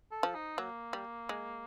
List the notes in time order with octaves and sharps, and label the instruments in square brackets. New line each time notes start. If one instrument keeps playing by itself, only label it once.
[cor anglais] A4
[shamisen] F3
[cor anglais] D#4
[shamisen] F#3 [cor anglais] A#3
[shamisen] G3
G#3